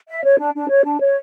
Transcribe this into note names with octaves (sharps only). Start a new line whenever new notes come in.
E5
C#5
D4
D4
C#5
D4
C#5